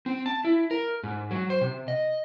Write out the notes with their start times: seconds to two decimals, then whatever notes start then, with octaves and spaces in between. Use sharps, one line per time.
0.06 C4
0.26 A5
0.45 E4
0.71 A#4
1.03 G#2
1.31 F#3
1.50 C5
1.61 C3
1.88 D#5